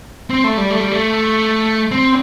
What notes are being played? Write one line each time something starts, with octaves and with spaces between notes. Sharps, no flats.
C4
A3
G3
A3
G3
A3
C4